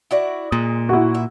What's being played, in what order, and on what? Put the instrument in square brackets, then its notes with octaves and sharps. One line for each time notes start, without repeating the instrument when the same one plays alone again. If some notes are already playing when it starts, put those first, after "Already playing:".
[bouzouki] E4 F#4 D5
[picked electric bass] A#2 [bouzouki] G#3
[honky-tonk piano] E4 F#4
[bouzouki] E5